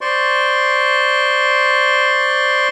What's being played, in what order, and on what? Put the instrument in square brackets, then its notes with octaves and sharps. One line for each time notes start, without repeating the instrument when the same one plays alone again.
[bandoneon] C5 D5 C6 C#6